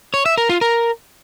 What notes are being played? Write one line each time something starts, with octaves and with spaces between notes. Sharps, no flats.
C#5
E5
A#4
F4
A#4